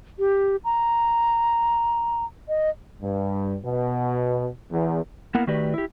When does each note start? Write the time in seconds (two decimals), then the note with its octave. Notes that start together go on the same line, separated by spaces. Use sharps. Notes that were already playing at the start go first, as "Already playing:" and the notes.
0.19 G4
0.65 A#5
2.49 D#5
3.02 G2
3.64 B2
4.71 E2
5.35 A#3 B3 E4 A#4 F#5
5.47 D#3 A3 F#4 G4 B4 D5
5.74 E4 G4